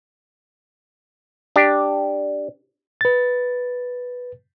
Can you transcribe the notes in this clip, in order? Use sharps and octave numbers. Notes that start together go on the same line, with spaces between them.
D4 G4
B4 A6